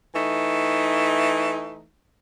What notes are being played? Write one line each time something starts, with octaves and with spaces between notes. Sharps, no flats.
E3 A3 D#4